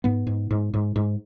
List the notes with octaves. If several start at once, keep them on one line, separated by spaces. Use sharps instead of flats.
G#2 B3
G#2
G#2
G#2
G#2